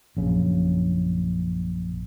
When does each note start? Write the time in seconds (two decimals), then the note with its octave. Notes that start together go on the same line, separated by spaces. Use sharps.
0.17 A#1 F#2 C#3